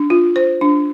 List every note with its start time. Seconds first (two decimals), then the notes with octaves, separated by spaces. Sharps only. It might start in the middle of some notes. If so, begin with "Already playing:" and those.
Already playing: D4
0.10 F4
0.36 C5
0.61 D4